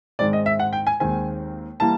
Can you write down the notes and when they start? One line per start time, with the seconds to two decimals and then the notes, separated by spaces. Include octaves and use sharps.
0.19 G#2 D#3 G#3 C4 D5
0.33 D#5
0.46 E5
0.60 F#5
0.73 G5
0.87 G#5
1.00 D#2 D#3 G#3 C4 G#5
1.80 E3 G3 A#3 A5